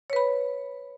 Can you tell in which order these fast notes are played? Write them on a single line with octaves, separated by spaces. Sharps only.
C#5 B4 B5